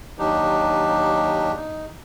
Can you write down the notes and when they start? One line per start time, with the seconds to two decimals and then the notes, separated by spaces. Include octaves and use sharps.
0.19 D#2 F#3 D4 D#4 G4
1.56 D#4